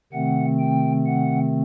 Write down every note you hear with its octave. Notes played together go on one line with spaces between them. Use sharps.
C3 D#3 A3 C4 F#5
G5
F#5